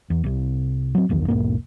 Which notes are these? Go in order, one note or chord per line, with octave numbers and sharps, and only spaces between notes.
E2
C2 C3
F#3 C4
F#1 B1 E2 D#3
E1 B1 G#2 A#3